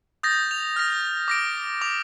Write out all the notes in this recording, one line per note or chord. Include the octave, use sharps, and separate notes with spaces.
D#6 G6 A6 A#6
F7
F6 A#6
D6 A#6 D7
D6 F7